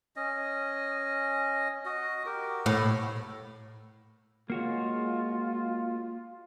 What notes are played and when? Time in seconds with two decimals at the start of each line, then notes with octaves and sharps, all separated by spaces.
0.16 C#4 D#5
1.85 F#4 D#5
2.26 F#4 G4 A#4
2.66 A2
4.50 G#3 A#3 F4 F#4 C#5